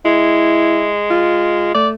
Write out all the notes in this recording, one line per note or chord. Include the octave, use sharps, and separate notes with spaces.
G#3 E4
F4
A3 D5